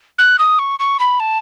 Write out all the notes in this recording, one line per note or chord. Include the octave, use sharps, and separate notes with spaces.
F#6
D#6
C#6
C#6
B5
A5